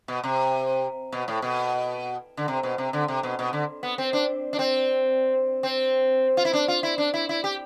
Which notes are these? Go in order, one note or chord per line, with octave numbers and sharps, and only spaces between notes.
B2
C3
B2
A2
B2
D3
C3
B2
C3
D3
C3
B2
B2
D3
B3
C4
D4
D4
C4
C4
F4
E4
D4
F4
E4
D4
E4
E4
G4